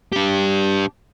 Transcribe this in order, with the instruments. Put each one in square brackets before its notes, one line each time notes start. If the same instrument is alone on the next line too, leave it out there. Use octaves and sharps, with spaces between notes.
[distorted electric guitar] D4 G4